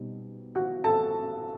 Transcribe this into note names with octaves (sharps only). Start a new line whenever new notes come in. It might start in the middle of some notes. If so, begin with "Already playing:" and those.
Already playing: B2 G3 C4 D#4
F#4 F#5
A4 A5